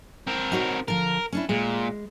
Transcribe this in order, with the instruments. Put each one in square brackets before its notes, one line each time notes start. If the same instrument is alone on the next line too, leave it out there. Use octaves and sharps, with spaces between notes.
[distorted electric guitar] C4 A#4
[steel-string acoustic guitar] D#4 F#4 C#5
[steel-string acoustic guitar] D3 F3 [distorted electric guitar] A#4
[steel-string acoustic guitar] C#4 D4 E4
[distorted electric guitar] A#2 [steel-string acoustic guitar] G#3